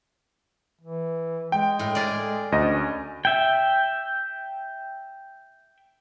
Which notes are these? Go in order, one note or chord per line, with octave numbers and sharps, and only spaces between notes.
E3
G#3 G5
A2
G#4 A#4 D5
D2 C#4 D#5
E5 G5